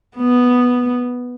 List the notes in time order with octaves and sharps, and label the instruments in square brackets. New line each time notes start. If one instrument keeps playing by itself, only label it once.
[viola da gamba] B3